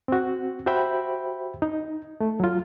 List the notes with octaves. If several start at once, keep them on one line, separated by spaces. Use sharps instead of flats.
C4 F#4
F#4 G4 C5 E5 G5 B5
D#4
A3
F#3 F4